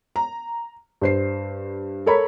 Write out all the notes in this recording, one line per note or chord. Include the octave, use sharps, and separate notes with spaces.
A#5
G2 C5 C7
A4 A#4 C#5 A#5 B5